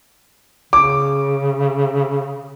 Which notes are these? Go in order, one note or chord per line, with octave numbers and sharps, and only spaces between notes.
C#3 D6